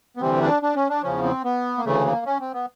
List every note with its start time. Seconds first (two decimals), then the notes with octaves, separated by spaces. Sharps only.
0.17 B3
0.21 D2 C3 E3 G3 C4
0.42 D4
0.63 D4
0.76 C#4
0.90 D4
1.02 E2 C#3 F3 C#4
1.24 C4
1.44 B3
1.78 A#3
1.85 D2 C#3 E3 A3
2.06 A#3
2.26 C#4
2.40 C4
2.53 B3